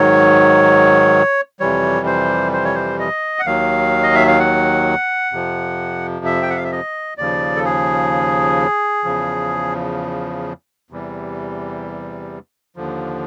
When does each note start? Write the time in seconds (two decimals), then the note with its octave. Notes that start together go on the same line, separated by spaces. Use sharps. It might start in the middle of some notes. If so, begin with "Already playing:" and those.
Already playing: G#2 D#3 F#3 C#5
1.60 F2 C3 E3 G3 C#5
2.06 C5
2.53 C5
2.65 C#5
2.75 C5
2.99 D#5
3.39 F#5
3.46 D#2 D#3 F#3 F5
4.03 D#5
4.15 E5
4.27 F5
4.39 F#5
5.32 F2 C3 F3
6.25 E5
6.42 G5
6.50 F#5
6.57 F5
6.64 E5
6.72 D#5
7.18 D#2 C#3 F3 D5
7.56 A4
7.65 G#4
9.04 E2 C#3 F3
10.90 E2 C3 E3 G3
12.76 D#2 D3 F3